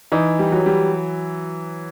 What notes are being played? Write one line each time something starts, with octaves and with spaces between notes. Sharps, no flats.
E3 D#4
G3
F#3
G3